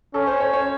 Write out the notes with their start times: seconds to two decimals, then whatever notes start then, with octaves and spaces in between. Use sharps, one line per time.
0.14 C#4 A4
0.27 C5
0.40 C#5
0.53 C#5